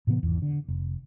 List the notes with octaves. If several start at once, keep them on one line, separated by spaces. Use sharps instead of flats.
A2 C3 E3 B3
G#1 E2
D3
F1